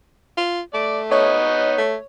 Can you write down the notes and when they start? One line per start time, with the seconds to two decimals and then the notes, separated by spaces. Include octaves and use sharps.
0.37 F4
0.74 A3 D5 D6
1.11 B3 D#4 C#5 D#5
1.78 A3